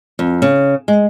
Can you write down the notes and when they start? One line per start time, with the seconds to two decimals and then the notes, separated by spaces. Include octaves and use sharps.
0.19 F2
0.42 C#3
0.88 G#3